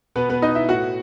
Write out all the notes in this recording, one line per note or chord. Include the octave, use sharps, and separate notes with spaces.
B2 B3 B4
B3 B4
D#4 D#5
E4 E5
A2 F#4 F#5